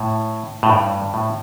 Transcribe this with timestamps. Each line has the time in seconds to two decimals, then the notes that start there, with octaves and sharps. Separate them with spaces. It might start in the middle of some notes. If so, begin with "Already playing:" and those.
Already playing: A2
0.63 A2
0.70 G2
1.14 A2